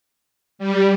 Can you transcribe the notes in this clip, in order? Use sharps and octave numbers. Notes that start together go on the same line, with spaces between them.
G3